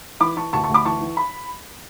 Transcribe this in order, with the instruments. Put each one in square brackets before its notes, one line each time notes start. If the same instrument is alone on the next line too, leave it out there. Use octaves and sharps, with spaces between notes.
[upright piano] E3 B5 D6
E3 A5 C#6
D2 A5 C#6
A5 C#6
D2
B5 D6
E3 A5 C#6
E3
B5